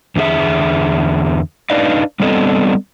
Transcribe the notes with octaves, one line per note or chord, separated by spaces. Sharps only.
E2 D3 E4 G#4 E5
D4 D#4 B4 D5 D#5 F5
G3 B3 C4 D4 A4 D#5